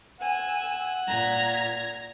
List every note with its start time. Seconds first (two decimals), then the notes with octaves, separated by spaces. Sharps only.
0.21 F#5 G#5 E6
1.07 A#2 A#5 G#6